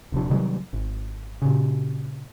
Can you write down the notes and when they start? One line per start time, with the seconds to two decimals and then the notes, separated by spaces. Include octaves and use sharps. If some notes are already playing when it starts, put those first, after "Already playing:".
0.12 D#1 C3 F3 D4
0.30 C3 D#3 F#3 G3
0.73 G#1
1.42 A#2 C#3